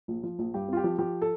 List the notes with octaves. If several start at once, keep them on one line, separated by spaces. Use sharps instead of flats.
A#1
F3
A#1
G2 G4
C4 F4
G4
F3
F3 G4
A4